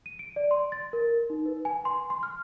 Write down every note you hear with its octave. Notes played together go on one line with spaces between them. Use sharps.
D#7
D7
D5
C6
A6
A#4
D#4
B4
G#5
C6
C6
F6